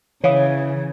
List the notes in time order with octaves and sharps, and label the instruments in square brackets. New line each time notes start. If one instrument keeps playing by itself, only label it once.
[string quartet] C#3 [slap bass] E3 [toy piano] C#5 F5 D#6